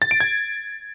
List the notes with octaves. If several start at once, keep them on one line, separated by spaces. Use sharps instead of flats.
A6
D7
G#6